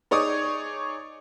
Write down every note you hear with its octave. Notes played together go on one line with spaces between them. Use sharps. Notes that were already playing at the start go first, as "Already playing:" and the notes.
D#4 G#4 C#5 D5 D6 D#6